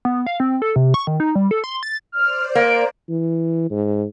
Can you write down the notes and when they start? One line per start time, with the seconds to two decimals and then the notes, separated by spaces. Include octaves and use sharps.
0.05 B3
0.26 F5
0.40 C4
0.62 A4
0.76 C3
0.94 C#6
1.07 D#3
1.20 D#4
1.35 G3
1.51 A4
1.64 C6
1.83 A6
2.12 C5 D5 F6
2.55 A#3 D7
3.09 E3
3.71 G#2